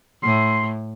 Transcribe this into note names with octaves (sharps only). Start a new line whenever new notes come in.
A2 C6